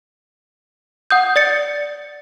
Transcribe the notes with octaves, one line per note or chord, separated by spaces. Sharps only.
F#5 D#6 G6
D5 A6 C#7